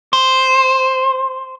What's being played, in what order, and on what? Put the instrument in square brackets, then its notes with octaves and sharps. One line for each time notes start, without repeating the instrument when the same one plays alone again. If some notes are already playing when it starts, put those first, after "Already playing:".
[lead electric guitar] C5